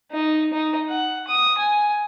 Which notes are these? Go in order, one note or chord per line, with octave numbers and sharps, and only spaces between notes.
D#4
D#4
F#5
D#6
G#5